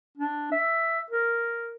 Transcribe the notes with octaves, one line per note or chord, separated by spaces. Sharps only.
D4
E5
A#4